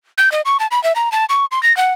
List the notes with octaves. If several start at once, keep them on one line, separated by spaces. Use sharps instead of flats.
G6
D#5
C#6
A5
B5
E5
A#5
A5
C#6
C6
A#6
F#5